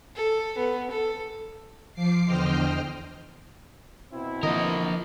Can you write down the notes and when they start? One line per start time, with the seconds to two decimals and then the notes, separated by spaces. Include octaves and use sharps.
0.16 A4
0.58 B3
0.91 A4
1.94 F3 D6 C7
2.26 E2 D3 C5 D#5 G5 F6
4.12 B2 C4 E4
4.43 D3 E3 F3 A#3 A#4 D#5